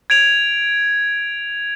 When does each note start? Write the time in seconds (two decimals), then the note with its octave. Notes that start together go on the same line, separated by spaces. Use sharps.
0.10 G#6 D7 F7